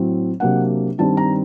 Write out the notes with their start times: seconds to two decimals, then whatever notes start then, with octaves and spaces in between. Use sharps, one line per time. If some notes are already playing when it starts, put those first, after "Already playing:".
Already playing: A2 F#3 C4
0.40 C3 F#3 A#3 D4 F#5
0.98 G2 D#3 G3 C4 A5
1.17 A#5